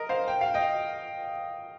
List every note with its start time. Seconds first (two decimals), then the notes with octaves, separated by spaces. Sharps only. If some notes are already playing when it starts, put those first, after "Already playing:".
Already playing: A#4 D#5
0.09 C5 F5
0.28 G5
0.41 F5
0.54 D#5 G5